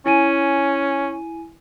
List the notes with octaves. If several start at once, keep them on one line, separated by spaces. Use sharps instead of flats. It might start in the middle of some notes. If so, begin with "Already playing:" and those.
C#4 E4 G#5 D#7